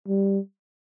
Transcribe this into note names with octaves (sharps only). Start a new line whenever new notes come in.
G3